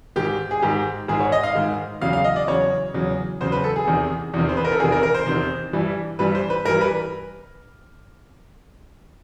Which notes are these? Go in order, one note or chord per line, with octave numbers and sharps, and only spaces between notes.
G#2 D#3 G#3 G4
G#4
G#2 D#3 G#3 G4
G#2 D#3 G#3 G#4
C#5
D#5
F5
G#2 D#3 G#3
E2 C#3 F#3 F5
F5
D#5
D5
E2 C#3 F#3 C#5
E2 C#3 F#3
E2 C#3 F#3 C5
B4
A4
G#4
E2 C3 D#3
E2 C3 D#3
C5
B4
A#4
A4
E2 C3 D#3 G#4
A#4
A#4
C5
E2 C3 D#3
G2 E3 G3
G2 E3 G3 B4
C5
B4
G2 E3 G3 A#4
B4